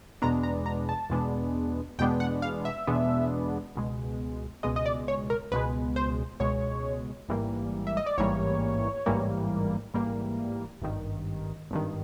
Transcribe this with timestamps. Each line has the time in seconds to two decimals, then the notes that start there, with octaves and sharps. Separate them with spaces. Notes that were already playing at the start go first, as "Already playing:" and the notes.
0.22 E2 B2 G#3 B3 D4 A#5
0.43 A#5
0.66 A#5
0.89 A5
1.10 E2 B2 G#3 B3 D4
1.99 E2 B2 G#3 B3 D4 G5
2.20 F#5
2.42 F5
2.65 E5
2.87 E2 B2 G#3 B3 D4
3.75 C#2 B2 G#3
4.63 C#2 B2 G#3 D#5
4.76 D#5
4.86 D5
5.08 C#5
5.30 A#4
5.52 C#2 B2 G#3 B4
5.96 C5
6.40 C#2 B2 G#3 C#5
7.29 A1 G#2 E3 G3 A#3
7.87 E5
7.97 D#5
8.06 D5
8.18 A1 G#2 E3 G3 A#3 C#5
9.06 A1 G#2 E3 G3 A#3
9.94 A1 G#2 E3 G3 A#3
10.82 G#1 G2 D#3
11.70 G#1 G2 D#3